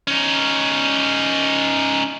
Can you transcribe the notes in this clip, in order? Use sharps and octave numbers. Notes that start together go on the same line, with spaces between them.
C#4 D#4